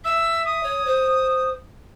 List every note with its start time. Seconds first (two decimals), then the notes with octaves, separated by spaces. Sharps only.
0.05 E5 E6
0.45 D#6
0.63 C#5
0.86 C5